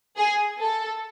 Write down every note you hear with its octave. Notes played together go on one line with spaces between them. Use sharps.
G#4
A4